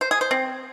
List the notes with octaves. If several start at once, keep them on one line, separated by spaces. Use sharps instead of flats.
C5
G#4
C5
C4